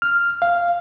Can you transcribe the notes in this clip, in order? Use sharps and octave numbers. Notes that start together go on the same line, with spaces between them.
F6
F5